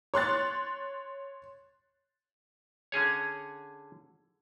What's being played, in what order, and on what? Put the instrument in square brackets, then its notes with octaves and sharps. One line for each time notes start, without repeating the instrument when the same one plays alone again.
[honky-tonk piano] C#5 C6 F#6 A6
[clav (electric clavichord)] D3 C#4 G#4 C#5